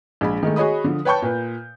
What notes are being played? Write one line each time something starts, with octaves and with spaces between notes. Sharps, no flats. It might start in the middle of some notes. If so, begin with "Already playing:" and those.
A#1 G#3 B5
D#3 G#3 A3
F#4 G#4 C#5 D#5 B5 D#6
D3 F3
B4 C#5 G5 A5 C#6 G6
A#2 B4